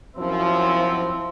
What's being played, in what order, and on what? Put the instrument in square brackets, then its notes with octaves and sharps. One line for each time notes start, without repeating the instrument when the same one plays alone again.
[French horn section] F#2 F3 [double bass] C4 E4